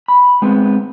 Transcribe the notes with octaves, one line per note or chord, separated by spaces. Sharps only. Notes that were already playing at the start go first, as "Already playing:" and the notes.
B5
G#3 B3 C4